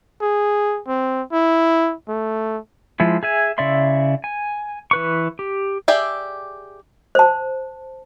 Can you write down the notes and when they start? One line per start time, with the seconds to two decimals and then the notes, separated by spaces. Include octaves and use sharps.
0.21 G#4
0.87 C4
1.32 E4
2.08 A3
3.00 F3 G#3 E4
3.23 G#4 E5 G#5
3.58 C#3 E4 D5 E5 C6
4.24 G#5
4.91 E3 B4 C#6
5.39 G4
5.88 G4 G#4 D5 E5 G5
7.15 C5 A5